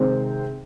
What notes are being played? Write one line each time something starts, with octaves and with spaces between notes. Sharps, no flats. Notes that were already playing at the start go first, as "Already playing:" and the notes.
Already playing: C3 D#3 G#3 C4 D#4